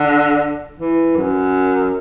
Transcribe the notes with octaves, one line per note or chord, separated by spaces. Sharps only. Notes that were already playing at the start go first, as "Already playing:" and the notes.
Already playing: D3
E3
F#2